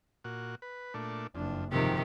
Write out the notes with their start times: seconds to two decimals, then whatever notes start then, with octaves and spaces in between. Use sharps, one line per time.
0.24 A#2 F#4
0.62 B4
0.94 A#2 A3 D4
1.35 F#1 F2 D4
1.72 G#2 C3 D#3 F3 F#3 G4